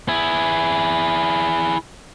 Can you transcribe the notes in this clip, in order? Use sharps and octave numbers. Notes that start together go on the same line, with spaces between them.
E4 G#4